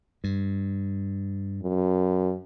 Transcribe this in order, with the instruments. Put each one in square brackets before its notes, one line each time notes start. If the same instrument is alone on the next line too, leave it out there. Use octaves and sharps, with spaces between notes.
[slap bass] G2
[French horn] F#2